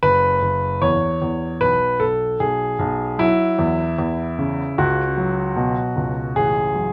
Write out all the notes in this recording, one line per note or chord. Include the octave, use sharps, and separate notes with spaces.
F#1 B4
F#1
E2 C#5
E2
B1 B4
B1 A4
B1 G#4
B1
F#3 E4
E2
E2
C#3
C#2 F#4
F#3
B2
C#2
A1 G#4
F#3